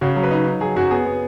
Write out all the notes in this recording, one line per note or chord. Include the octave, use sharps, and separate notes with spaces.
C#3 F#4
F#3
B4
D#4
D#4
F#3 G#4
F#2 F#4
B3 G#4
B3